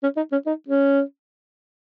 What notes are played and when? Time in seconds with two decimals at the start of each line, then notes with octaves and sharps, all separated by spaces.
0.03 C#4
0.17 D#4
0.32 C#4
0.46 D#4
0.68 C#4